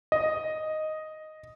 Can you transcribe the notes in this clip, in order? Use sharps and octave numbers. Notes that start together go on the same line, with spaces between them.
D#5